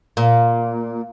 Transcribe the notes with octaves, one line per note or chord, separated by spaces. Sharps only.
A#2